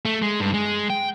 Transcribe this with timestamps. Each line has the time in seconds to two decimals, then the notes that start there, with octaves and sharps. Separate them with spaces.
0.05 A3
0.22 G#3
0.40 G2
0.54 G#3
0.90 G5